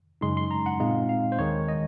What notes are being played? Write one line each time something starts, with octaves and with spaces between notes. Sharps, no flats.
F#2 C#3 G#3 D#4 C6
C6
A#5
F#5
A#2 G#3 C4 D#4 F5
F5
C5
D#2 D#3 G#3 C#5
D#5